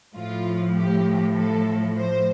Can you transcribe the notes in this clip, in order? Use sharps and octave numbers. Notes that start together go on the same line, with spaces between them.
A2 F3 F4
G4
A4
C5